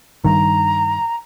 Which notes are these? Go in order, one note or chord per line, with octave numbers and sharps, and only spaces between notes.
G2 D#3 A#5